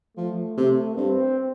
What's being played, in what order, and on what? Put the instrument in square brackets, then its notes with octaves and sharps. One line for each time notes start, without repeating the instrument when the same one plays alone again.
[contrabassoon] F3 [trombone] A3
[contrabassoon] C3
[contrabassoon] G2 [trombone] C4